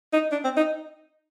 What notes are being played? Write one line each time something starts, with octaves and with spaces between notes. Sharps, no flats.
D#4
D4
C4
D#4